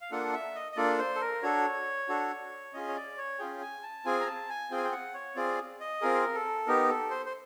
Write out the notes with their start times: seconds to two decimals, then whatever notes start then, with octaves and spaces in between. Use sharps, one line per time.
0.01 F5
0.11 A#3 D4 F4 A4 F#5
0.33 E5
0.55 D#5
0.72 D#5
0.76 A#3 D4 F4 A4 D5
0.99 C5
1.15 A4
1.21 A#4
1.43 D4 F#4 A4 C#5
2.09 D4 F#4 A4
2.74 C#4 F4 G#4 D#5
2.89 C#5
2.96 D5
3.17 C#5
3.39 C#4 F4 G#4 G5
3.62 G#5
3.83 A5
4.05 C4 F4 G#4 G#5
4.20 A#5
4.27 A5
4.49 G#5
4.71 C4 F4 G#4 G5
4.77 G#5
4.84 G5
4.92 F#5
5.14 C#5
5.36 C4 F4 G#4 D5
5.80 D#5
6.01 C4 F4 G#4 A#4
6.35 A4
6.67 B3 D#4 G4 A#4
6.89 A4
7.11 C5
7.26 C5